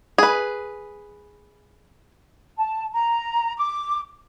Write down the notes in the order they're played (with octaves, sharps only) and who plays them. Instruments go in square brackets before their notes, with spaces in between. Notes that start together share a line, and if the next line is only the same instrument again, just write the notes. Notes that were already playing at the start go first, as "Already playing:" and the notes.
[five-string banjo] G#4 B4
[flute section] A5
A#5
D6